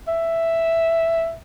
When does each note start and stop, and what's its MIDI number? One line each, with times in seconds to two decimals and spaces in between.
0.08 1.33 76